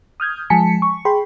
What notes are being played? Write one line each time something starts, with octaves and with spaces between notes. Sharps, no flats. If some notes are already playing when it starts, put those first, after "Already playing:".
D#6 F6 G6 G#6
F3 G#3 G#5 A5 B6 C#7
C#6
G#4 G5 B5 C6